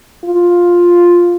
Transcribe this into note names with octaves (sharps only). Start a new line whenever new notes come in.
F4